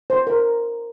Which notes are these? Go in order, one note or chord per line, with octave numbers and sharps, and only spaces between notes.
C5
A#4